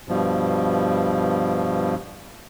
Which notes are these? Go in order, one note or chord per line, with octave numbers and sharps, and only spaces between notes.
G2 B2 F3